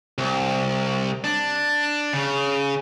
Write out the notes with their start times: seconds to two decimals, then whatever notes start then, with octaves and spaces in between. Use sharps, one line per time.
0.18 C2
1.24 D4
2.13 C#3